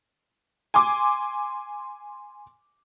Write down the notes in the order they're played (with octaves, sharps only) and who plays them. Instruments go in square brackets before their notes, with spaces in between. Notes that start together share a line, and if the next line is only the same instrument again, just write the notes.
[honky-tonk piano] G#5 C6 D6